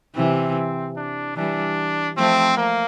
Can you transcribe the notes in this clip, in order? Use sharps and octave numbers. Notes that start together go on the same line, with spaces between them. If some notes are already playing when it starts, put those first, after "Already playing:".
C3 E3 C4
D4
E3 G3 D4
F3 A3 C4
A#3